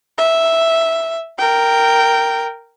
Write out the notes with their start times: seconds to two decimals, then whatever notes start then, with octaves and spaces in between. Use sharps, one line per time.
0.18 E5
1.38 A#4 G5